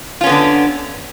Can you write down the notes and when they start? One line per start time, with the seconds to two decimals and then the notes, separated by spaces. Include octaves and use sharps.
0.21 F4
0.24 C#4
0.26 B3
0.29 D3
0.32 D4